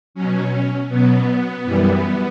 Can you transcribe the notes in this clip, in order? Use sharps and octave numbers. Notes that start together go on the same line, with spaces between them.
B2 F#3 C#4
B2 F#3 B3
F#2 E3 G3